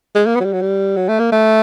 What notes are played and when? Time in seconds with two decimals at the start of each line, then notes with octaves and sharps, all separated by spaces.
0.15 G#3
0.26 A#3
0.36 B3
0.40 F#3
0.45 G3
0.53 F#3
0.61 G3
0.97 F#3
1.09 A3
1.19 A#3
1.32 A3